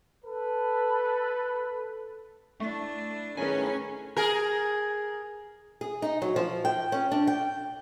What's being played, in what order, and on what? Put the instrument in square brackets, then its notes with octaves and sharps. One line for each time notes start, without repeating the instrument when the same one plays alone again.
[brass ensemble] A4 B4
[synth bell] A3 [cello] D4 E4
[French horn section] A2 D#3 G#4 [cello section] C#4 [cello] A#4 B4 [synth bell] G#5
[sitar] G#4 A#4
[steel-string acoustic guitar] G#4
D#4
F#3
F3
G5
C#4
D4
G5